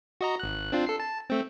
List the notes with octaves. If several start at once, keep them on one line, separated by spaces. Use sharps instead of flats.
F#4 D#5 A#5
G#1 F#6
C4 D4 F4
A4 C7
A5
A3 C4